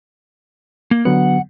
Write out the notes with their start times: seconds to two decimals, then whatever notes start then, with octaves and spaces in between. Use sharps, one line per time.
0.91 A#3
1.05 D3 F#3 B3 F#5